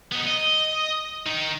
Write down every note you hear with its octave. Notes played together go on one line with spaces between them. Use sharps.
B3 D#4
D#5
D#3 D#4